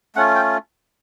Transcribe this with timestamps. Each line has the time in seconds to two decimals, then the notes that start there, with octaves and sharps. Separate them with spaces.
0.16 A3 C#4 F4 F#5
0.35 G5